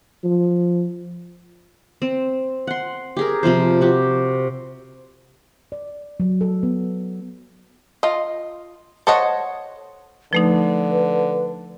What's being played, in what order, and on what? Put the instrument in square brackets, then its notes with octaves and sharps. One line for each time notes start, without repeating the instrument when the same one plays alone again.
[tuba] F3
[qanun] C4
F#5 C6
G4 G#4 A#4
C3 F3 F4 C5
F#4 G4
[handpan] D5
F#3
A4
B3
[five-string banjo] F4 D#5
A4 C5 C#5 D#5 F#5
[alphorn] D3 [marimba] F3 A3 D#4 [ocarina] B4